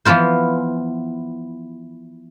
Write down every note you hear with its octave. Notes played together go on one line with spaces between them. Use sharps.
E3 F3 B3 F4 C5